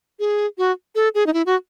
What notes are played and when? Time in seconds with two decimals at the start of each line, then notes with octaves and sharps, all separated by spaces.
0.20 G#4
0.58 F#4
0.95 A4
1.15 G#4
1.26 D#4
1.34 E4
1.46 F#4